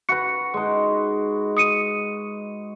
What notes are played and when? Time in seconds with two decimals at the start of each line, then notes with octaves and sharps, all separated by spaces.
0.09 F#4 B4 C#7
0.54 G#3 D#4
1.57 D#6 C#7 D#7